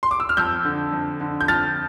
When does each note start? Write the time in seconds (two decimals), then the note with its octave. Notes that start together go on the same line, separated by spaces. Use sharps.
0.03 C6
0.11 D6
0.20 E6
0.29 F6
0.37 F2 E6 G6
0.65 D3
0.93 F2
1.21 D3
1.41 G6
1.48 F2 F6 A6